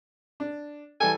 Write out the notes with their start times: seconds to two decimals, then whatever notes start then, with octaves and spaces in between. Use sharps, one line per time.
0.40 D4
1.00 E3 G3 A4 G#5